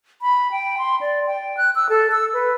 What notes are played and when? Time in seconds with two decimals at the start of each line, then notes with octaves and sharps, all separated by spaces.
0.22 B5
0.52 G5
0.78 C6
1.01 D5
1.26 G5
1.57 F#6
1.75 E6
1.89 A4
2.12 E6
2.34 B4